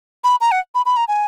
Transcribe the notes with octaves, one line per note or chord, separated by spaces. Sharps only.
B5
A#5
F#5
B5
B5
A#5
G#5